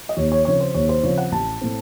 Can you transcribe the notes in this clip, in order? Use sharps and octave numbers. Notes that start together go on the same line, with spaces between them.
D#5
D#2 C#5
C#5
C#3 F3 C4 C#5
C5
D#2 C#5
C5
C#3 F3 C4 C#5
F#5
A1 A5
A2 A3 C4